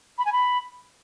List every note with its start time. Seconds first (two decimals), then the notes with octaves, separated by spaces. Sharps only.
0.18 B5
0.25 G#5
0.33 B5